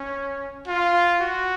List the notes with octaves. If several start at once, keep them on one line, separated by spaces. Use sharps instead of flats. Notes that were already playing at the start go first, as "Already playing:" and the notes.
Already playing: C#4
F4
F#4